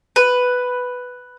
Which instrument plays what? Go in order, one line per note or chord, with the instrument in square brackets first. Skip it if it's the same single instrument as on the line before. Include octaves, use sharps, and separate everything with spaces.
[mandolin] B4